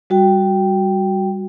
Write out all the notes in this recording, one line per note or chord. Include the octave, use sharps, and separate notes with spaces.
G3 F#4 G5